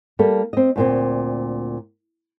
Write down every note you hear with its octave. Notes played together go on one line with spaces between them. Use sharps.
G3 A#3 A4
C4 D#5
D2 A#2 C4